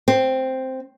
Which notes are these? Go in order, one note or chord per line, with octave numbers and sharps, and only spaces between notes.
C4